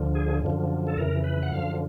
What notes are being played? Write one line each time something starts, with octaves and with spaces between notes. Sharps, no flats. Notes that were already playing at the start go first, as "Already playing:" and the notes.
Already playing: D2 D3 F3
G#4
F#2 D3 F3
A4
F2 C#3 E3 A#4
B4
F#5
F#2 D3 F3 F5